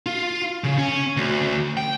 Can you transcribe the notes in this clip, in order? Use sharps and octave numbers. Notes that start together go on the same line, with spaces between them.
F4
C#3
C#4
D2
G5